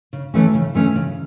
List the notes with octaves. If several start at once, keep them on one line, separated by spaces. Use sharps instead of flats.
C#3
E3 A3 C#4
C#3
E3 A3 C#4
C#3